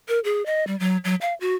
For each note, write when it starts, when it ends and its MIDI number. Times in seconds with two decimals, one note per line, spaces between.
0.08 0.20 70
0.24 0.44 68
0.46 0.66 75
0.67 0.78 55
0.80 0.97 54
1.04 1.15 54
1.21 1.34 77
1.41 1.55 66